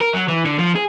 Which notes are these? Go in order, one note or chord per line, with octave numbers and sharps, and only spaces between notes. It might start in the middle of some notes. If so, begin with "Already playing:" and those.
A#4
F#3
E3
D3
F3
G#4